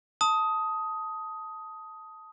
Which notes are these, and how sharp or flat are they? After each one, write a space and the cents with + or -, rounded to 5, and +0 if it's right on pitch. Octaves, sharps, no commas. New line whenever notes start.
A5 +5 D#6 +15